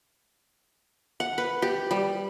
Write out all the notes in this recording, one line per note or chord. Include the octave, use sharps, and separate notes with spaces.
F#5
B4
G4
G3